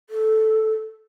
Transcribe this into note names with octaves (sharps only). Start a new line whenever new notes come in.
A4